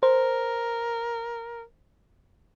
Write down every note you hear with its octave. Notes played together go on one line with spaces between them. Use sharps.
A#4 C5